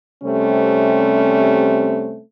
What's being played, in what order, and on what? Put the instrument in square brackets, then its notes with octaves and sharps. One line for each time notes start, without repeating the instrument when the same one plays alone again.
[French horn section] C3 G3 A3 C4 C#4